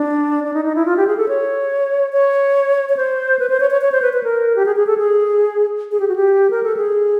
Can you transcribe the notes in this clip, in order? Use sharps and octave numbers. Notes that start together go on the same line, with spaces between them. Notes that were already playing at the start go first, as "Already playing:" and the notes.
Already playing: D4
D4
D#4
D#4
E4
F4
G4
G#4
A4
C#5
C#5
C#5
C5
B4
C5
C#5
C#5
C#5
C5
B4
B4
A#4
G4
G#4
G#4
A4
G#4
G#4
G4
F#4
G4
A#4
A4
G#4